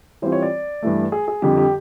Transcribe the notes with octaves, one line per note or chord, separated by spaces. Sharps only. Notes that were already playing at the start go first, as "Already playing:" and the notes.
E3 G3 C4 F4 C5
C#5
D5
G2 E3 A3
G#4
G#4
F2 D3 G3 G4
G4